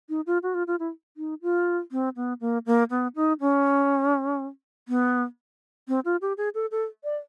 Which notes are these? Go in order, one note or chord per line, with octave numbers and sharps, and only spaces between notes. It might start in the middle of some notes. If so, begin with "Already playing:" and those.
D#4
F4
F#4
F4
F4
E4
D#4
F4
C4
B3
A#3
A#3
B3
D#4
C#4
B3
C4
F4
G4
G#4
A4
A4
D5